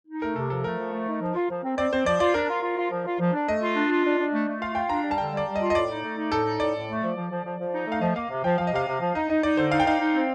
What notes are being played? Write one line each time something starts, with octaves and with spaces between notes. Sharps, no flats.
D#4
A3 A#4
C3 A4
F3 A4
A3 A#4
F3
A3
D#4
F3
F4
F3
C4
C4 D5
C4 C5
F3 D5
F4 D5
D4 A#4
F4
F4
F4
F3
F4
F3
D4
A3 D#5
F4
D4
F4
D4
D4
A3
A3
F4 F5
F4 G5
D4 A#5
G3
A5
D3 G5
G3
D5
G3
F4 D#5
D#5
A2 D5
D#4
A3
D#4
A2 A4
D#4
A2 D5
A2
A3
F3
F3
F3
F3
F3
D#4
A3 F5
F3 D#5
A#3 F5
C3
F3 G5
F3 F5
D#5
C3 F5
C3
F3
D#4 D#5
D#4 D#5
D#4 D5
D3 C5
D#4 F5
G5
D#4 F5
D#4
C4